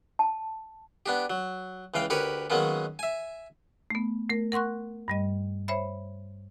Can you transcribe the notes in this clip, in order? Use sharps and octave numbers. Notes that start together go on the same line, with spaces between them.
A5
B3 D4 G4
F#3
C#2 E3 F5 G5
D2 G4 A#4 B4 C#5 B5
D#3 F#3 G#3 A#3 B3 C#4
E5 G#5
A3 B3
A3 A#4
A#4 F#5 C6 C#6 F#6
G2 G3 D#5
C5 C#5 E5 B5